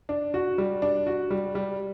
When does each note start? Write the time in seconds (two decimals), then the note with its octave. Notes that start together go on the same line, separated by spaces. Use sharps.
0.09 D4
0.34 F#4
0.58 G3
0.82 D4
1.07 F#4
1.30 G3
1.55 G3